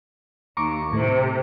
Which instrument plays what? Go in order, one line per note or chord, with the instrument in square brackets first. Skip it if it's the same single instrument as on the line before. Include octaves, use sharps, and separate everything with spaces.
[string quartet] D#2 [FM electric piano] A#5 C#6 D6
[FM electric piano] A2 [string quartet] C3